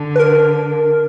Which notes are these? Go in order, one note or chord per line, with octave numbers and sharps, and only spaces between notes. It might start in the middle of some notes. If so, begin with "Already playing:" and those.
Already playing: D3
B4
A#4